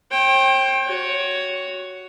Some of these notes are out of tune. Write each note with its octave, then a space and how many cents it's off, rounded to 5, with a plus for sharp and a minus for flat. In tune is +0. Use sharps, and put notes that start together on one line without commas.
C5 +45 G5 +0
F#4 +0 C#5 +10